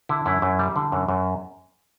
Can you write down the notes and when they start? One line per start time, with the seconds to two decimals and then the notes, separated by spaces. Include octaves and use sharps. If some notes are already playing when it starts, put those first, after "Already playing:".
0.09 D3 E4
0.26 F#2 E4
0.42 F#2
0.59 G3
0.76 D3
0.92 F#2
1.08 F#2